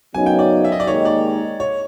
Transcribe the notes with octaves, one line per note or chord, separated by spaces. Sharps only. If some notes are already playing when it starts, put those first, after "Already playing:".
F#2 C#3 F#3 B3 D#4 G#5
G5
D5
E5
D#5
D5
D#2 D#3 G#3 C#5
D5
C#5